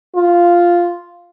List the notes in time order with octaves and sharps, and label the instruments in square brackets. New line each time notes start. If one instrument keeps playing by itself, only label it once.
[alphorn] F4